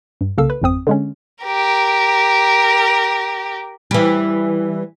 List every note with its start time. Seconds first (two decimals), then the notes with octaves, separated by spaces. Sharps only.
0.21 G2
0.38 C2 C#3 A#3 A4 F5 E6
0.50 B4
0.62 G#1 F2 C4 D#6
0.87 D3 G#3 C#4
1.45 G4 A#4
3.91 E3 G3